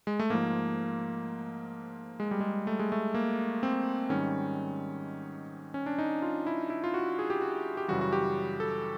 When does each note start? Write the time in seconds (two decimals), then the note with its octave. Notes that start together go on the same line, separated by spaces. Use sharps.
0.07 G#3
0.19 A3
0.30 G#2 F3 A#3
2.20 G#3
2.31 G3
2.41 G#3
2.67 A3
2.79 G#3
2.92 A3
3.15 A#3
3.63 C4
4.09 G#2 D#3 G3 C#4
5.74 C#4
5.86 D4
5.98 D#4
6.22 F4
6.47 E4
6.70 E4
6.84 F4
6.94 F#4
7.19 G#4
7.30 G4
7.42 F#4
7.77 G4
7.88 F#2 C#3 E3 G3 F#4
8.01 F#4
8.12 G4
8.60 A4